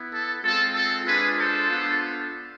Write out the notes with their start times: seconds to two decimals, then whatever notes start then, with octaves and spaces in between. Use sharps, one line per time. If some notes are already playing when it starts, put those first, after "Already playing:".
Already playing: B3 E4
0.11 A4
0.42 G#3 C4 F4 A4
0.74 A4
1.05 G#3 D4 F4 G#4 B4
1.37 A4 C5
1.68 B3 D4 F4